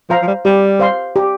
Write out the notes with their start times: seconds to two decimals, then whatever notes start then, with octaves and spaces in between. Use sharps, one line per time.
0.10 F3 C5 F5 A#5
0.22 F3
0.28 G3
0.45 G3 G4
0.80 C5 F5 C6
1.16 G4